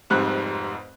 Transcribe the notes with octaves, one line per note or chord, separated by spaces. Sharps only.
F1 F2 G#2 G3 F#6